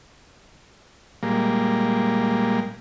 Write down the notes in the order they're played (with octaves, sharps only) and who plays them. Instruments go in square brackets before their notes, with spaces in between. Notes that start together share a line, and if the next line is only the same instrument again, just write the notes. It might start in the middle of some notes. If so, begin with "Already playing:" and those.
[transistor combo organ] A#2 G3 G#3 A#3